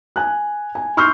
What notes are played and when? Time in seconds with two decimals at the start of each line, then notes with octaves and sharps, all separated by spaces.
0.16 G#5 F#6
0.75 G#5
0.97 C6 C#6 E6 F6 G6 C7